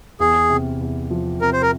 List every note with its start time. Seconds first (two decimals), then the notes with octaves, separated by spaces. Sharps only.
0.20 E2 G#4
0.50 C3
0.81 E2
1.11 F3
1.41 C3 A#4
1.53 C5
1.62 A#4